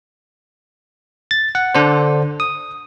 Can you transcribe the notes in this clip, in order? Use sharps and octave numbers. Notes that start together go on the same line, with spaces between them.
A6
F#5
D3 D4 C5
D#6